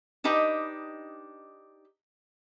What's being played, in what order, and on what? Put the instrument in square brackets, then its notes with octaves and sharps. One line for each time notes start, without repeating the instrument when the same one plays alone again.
[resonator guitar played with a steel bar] D4 D#4 G4 B4 D#5